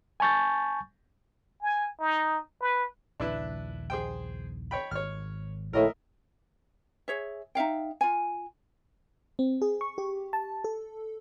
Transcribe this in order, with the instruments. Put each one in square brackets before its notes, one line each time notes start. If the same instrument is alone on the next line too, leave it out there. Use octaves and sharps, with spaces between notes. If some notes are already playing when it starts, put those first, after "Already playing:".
[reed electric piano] G#5 A5 C#6 G6 A6
[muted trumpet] G#5
D#4
B4
[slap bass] A#1 D#2 C#3 [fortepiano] D4 E4 B4
[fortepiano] G#4 C5 G5
C#5 G5 B5
[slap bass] G#1 [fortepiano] C#5 F6
[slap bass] A#1 D#3 [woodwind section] A2 [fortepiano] A#4 D#5 E5
[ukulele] G#4 C#5 E5
D#4 E5 F5 G5
F4 G#5
[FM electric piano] C4
G#4
C#6
G4
A5
A4